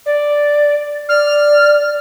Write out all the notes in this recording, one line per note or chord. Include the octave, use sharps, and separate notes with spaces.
D5
D5 F6